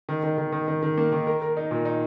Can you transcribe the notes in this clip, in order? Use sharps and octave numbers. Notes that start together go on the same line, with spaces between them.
D#3
D#3
D#3
D#3
D#3
D#3
A#3
D#3
A#4
A#4
D#4
A#2
D#4